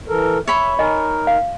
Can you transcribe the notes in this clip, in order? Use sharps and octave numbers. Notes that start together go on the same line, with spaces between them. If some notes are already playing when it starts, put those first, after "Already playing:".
E3 A4 A#4
C#5 E5 B5
D#4 A#4 D#5 G#5
F5